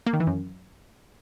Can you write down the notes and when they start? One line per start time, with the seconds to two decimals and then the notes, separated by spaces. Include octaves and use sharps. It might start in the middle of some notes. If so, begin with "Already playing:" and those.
0.06 A#3
0.13 D#3
0.20 E3
0.27 F#2